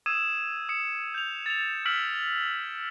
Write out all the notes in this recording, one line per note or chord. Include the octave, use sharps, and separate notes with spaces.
D#6 E6 G#6 D#7 E7
D#6 C#7 E7
G6 F7
A6 F7
E6 F6 B6 D7 F#7